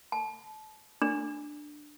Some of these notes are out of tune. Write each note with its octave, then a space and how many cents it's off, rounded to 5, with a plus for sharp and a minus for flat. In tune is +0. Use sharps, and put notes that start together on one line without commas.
A5 -30
D4 +10